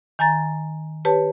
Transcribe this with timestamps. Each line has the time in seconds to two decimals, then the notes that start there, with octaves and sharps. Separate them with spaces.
0.19 D#3 G#5 A#5 A6
1.05 G4 B4 C#5 A5